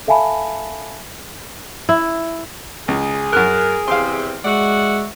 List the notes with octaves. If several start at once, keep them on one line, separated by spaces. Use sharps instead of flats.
A4 E5 F5 G#5 A5 B5
E4
C#2 G#4
F#2 A#4 F#6
E2 C3 C4 F5 C6
G#3 F#4 D5 E5 F#5